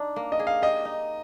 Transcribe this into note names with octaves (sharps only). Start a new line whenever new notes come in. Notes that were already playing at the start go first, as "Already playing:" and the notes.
Already playing: D4 D#4
A#3
D#5
G#4
F5
G4 D#5
D#4